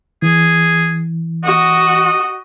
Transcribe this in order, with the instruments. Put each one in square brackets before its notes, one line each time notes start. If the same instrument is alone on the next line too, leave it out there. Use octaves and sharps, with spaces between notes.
[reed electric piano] E3 [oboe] G#4
[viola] F#4 [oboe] D#5